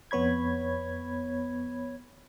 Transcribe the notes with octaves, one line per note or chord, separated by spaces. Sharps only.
F2 B3 C#5 B5 G#6